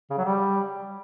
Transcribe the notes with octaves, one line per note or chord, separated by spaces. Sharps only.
C#3
F#3
G3